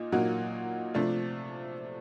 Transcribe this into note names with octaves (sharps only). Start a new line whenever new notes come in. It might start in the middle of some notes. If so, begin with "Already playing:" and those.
Already playing: A#2 A#3 D#4
A#2 F#3 A#3 D#4 F#4
C3 F3 A3 D4 F4